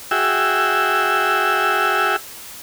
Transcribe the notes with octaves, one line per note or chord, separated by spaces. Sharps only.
F#4 G#4 E5 G5 E6